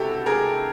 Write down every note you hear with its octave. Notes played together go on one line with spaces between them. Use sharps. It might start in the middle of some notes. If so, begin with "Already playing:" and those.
Already playing: C#2 C3 E4 F#4 G4 A4
G#4 A#4